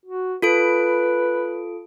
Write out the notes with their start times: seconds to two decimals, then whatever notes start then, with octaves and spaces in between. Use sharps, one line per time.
0.06 F#4
0.42 F4 A4 B4 D7